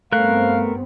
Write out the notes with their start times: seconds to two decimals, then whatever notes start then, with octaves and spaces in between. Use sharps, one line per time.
0.12 G2 A3 B3 C4 A#4 F5 F#6